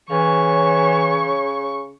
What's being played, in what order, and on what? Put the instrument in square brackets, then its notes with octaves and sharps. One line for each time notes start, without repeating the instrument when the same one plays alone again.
[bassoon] C#3 [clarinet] E3 [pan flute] C#5 [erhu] C#6